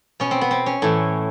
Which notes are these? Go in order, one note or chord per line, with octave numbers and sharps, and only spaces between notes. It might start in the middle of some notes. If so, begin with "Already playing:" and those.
B2 C#4
C4
B3
C4
C#4
A2 E3